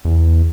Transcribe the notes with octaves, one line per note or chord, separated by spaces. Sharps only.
E2